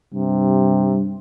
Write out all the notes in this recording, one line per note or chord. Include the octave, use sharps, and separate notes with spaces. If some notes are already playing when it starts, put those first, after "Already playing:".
G2 C3